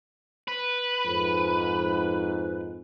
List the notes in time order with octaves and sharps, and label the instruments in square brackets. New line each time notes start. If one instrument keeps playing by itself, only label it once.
[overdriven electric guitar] B4
[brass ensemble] F2 G#2